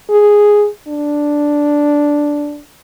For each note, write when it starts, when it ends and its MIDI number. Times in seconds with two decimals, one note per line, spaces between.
0.10 0.67 68
0.88 2.60 62